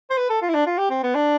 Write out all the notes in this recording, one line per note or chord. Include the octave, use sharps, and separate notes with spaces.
C5
B4
A4
F4
E4
D4
F4
G4
C4
B3
D4